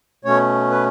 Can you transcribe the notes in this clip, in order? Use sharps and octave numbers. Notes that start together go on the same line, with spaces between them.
B2 A3 C#4 C#5
B4